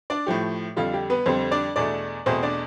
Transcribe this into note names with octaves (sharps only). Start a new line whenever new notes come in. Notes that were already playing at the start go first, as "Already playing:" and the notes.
D4 D5
A2 F3 A3 G4
F2 D3 G3 F4
G4
B3 B4
F2 D3 G3 C4 C5
D4 D5
E2 B2 A3 D4 D5
E2 B2 A3 C4 C5
D4 D5